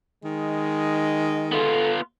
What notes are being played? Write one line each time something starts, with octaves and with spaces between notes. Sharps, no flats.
D#3 G#3
B3 F4 A4